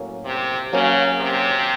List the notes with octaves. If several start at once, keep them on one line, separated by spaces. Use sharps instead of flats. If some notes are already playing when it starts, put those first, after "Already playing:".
Already playing: A2 F#3 A#3 C#4
C3
C#3 F#3 A#3 C#4
C3